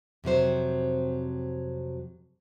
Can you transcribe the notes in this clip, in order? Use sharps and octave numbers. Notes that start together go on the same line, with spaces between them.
F2 C3 F#3 C5